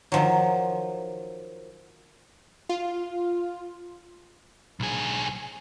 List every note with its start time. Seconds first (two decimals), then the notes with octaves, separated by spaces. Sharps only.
0.12 D#3 F3 F#3
2.69 F4
4.80 B1 G#4